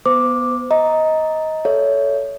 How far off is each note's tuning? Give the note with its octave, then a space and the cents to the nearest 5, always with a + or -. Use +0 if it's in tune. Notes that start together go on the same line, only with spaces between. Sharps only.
B3 -5 C5 -35 D6 +0
D#5 +15 A#5 +0
A4 +0 C#5 +25 E5 +0